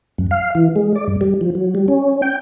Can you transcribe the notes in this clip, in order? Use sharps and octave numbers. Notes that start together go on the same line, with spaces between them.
F#2
F5
E3
G#3
D5
G2
G3
F3
F#3
G3
C#4
G5